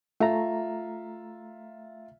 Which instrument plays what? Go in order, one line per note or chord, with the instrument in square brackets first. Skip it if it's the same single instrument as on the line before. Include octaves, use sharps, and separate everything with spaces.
[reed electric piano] A3 A#5 [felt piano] F4 E5